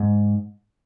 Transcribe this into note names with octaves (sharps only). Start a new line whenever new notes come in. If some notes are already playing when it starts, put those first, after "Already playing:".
Already playing: G#2